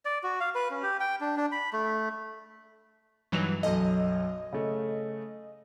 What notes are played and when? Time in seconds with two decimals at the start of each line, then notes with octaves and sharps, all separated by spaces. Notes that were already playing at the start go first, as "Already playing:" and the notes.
0.05 D5
0.23 F#4
0.40 F5
0.55 B4
0.71 C#4
0.83 G4
1.00 G5
1.21 D4
1.37 D4
1.52 B5
1.73 A3
3.32 G2 E3 F#3 D#4 B4 F7
3.63 B1 F#2 A4 D#5
4.52 C#3 A3